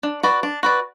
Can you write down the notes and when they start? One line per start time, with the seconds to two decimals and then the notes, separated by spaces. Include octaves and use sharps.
0.03 D4
0.23 F#4 B4 D5
0.43 D4
0.63 F#4 B4 D5